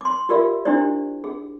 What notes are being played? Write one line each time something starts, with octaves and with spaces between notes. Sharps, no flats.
C6 D6
F4 G4 A#4 D5 E5 F5
D4 E4 G4 C5 D5
G#4